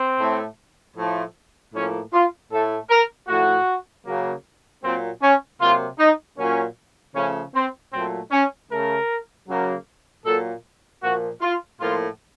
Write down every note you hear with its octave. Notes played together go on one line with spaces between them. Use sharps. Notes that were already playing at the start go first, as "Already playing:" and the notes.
Already playing: C4
A2 A3
A2 F3 A3
A2 F3 A#3 C#4
F4
A2 A3 A4
A#4
A2 F3 A3 F#4
C#3 F#3 A#3
A#2 F#3 A#3 C4
C#4
C3 F#3 A#3 F4
D#4
A#2 F#3 A#3 C#4
C#3 F3 A3 C#4
C4
A#2 F#3 A3 C4
C#4
C#3 A3 A#4
C#3 F#3 A#3
A#2 F#3 A#3 A4
A#2 F3 A#3 F#4
F4
A2 F3 A#3 F4